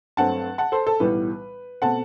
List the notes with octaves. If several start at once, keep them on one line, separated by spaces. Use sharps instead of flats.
G2 F#3 A3 C4 F#5 A5
F#5 A5
A4 C5
A4
B1 A2 E3 G3 B3 B4
B2 A3 C4 F#5 A5